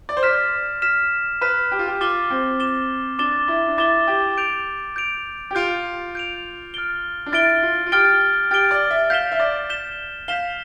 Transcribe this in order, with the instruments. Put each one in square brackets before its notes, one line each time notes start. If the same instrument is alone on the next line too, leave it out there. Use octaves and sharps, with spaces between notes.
[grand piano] D5
C5
[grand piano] D5 [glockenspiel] F6 B6 E7
[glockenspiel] F6 B6 E7
[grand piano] B4 [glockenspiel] F6 B6 E7
[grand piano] G4
F4
G4
[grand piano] F4 [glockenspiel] D6 A6 E7 G7
[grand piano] C4
[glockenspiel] D6 A6 E7 G7
[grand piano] D4 [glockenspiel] D6 A6 E7 G7
[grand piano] E4
D4
[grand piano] E4 [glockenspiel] D6 A6 E7 G7
[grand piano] G4
[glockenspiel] G6 D7 F7
G6 D7 F7
[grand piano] G4
[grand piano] F4 [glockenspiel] G6 D7 F7
[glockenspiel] G6 D7 F7
F6 A6 D7 G7
[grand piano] D4
[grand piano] E4 [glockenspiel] F6 A6 D7 G7
[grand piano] F4
F4
[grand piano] G4 [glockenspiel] F6 A6 D7 G7
[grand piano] G4 [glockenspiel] F6 A6 D7 G7
[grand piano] D5
E5
[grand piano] F5 [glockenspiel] G6 B6 E7 G7
[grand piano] E5
D5
[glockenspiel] G6 B6 E7 G7
[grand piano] F5 [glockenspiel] G6 B6 E7 G7